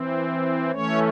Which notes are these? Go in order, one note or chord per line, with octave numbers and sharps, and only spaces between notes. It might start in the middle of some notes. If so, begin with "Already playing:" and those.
Already playing: E3 C4
E3 A3 C#4 C#5